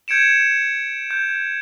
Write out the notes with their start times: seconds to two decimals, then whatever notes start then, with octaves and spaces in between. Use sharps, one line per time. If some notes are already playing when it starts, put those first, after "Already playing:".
0.08 G6 G#6 C#7 D7 E7
1.11 G6